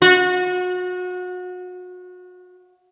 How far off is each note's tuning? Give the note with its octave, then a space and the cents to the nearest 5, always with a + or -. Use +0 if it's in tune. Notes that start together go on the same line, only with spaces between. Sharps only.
F#4 -30